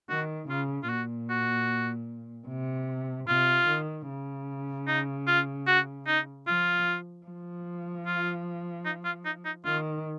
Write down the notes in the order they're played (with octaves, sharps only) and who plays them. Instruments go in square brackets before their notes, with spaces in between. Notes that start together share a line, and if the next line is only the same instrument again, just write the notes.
[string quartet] D#3 [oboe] F#4
[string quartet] C#3 [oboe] F4
[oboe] F4
[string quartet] A#2 [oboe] F#4
[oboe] F#4
[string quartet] C3
[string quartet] C3 [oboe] F4
[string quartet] D#3
C#3
[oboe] D#4
F4
F#4
D#4
[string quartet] F3 [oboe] F4
[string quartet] F3
[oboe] F4
D#4
F4
D#4
D#4
[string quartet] D#3 [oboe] F4